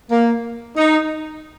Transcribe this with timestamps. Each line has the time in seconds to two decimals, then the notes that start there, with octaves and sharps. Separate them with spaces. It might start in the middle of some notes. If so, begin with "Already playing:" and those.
0.10 A#3
0.76 D#4